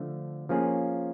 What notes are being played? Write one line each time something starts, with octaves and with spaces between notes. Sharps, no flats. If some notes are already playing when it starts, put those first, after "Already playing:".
Already playing: D3 F3 A3
F3 A#3 C#4 F4 G#4